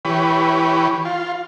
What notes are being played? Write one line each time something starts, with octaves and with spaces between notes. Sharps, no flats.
E3 G4 B4 C#5
F4